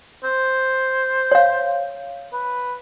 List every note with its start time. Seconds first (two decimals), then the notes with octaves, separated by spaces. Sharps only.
0.24 C5
1.32 C#5 F5
2.33 B4